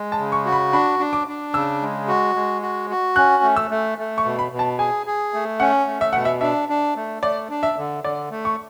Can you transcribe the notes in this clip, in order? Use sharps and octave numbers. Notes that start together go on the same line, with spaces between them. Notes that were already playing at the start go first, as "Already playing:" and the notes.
Already playing: G#3
A5
C#3
C#6
F#4
B5
D4 B5
D4
D6
D4
C#3 E6
G#3
F#4
G#3
F#4
F#4
C#4 F#6
A3
E6
A3
A3
C#6
B2
B5
B2
A5
G#4 G#5
G#4
A3
C#4 F#5
A3
E5
B2 F#5
E5
D4 E5
D4
A3
A3 D5
D4
E5
D3
D3 D5
A3
C#6